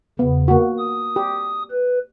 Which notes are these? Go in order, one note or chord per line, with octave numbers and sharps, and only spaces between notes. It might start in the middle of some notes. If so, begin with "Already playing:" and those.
E2 C#3 B3
A#3 F#4
D#6
G4
B4